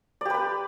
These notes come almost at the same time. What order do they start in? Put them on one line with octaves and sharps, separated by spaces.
D5 G4 B4 B5